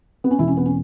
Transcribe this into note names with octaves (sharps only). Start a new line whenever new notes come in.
B3
C#4
E1 E2 B2 E4
C#4
B3
C#4